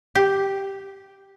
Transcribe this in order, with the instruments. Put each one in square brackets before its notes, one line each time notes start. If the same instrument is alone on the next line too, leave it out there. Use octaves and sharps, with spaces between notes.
[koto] G4